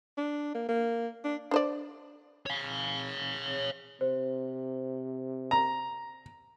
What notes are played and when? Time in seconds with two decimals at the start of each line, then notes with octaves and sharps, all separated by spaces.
0.18 D4
0.55 A#3
0.69 A#3
1.24 D4
1.51 D4 C5 D5
2.46 C#5 F5
4.01 C3 C5
5.51 A#5